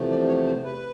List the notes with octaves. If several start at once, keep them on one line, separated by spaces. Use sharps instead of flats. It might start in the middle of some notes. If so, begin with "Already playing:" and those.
Already playing: E2 C3 F3 A3
D5
C#5
C5
B4